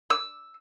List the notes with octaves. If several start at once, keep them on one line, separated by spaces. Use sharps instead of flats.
E6